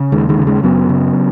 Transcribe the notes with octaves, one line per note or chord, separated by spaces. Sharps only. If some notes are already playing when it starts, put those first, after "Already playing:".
Already playing: C#3
D#2 D#3 G#3
D#3 G#3
C#3
D#3 G#3
F#2 F#3 B3
C#3